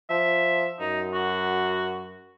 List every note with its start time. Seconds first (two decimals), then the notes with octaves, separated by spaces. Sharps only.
0.10 F3 E5
0.80 F#2 D#4
1.14 F#4